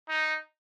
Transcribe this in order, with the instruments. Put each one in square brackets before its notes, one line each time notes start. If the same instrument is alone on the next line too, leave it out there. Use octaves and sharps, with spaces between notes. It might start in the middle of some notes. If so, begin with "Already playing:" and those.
[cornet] D#4